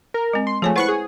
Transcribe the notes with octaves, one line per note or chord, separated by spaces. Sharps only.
A#4
G#3 C4
C6
F3 A3 G#4 C#5 G#5
E4 B4 C5 F#5 C#6 F#6
G#4